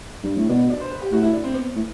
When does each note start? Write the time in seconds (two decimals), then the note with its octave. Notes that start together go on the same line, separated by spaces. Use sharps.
0.24 G2
0.37 A2
0.49 B2 D4
0.70 D4
0.81 C5
0.91 B4
1.02 G4
1.12 A2 F#4
1.23 E4
1.33 D4
1.44 C4
1.54 B3
1.76 A2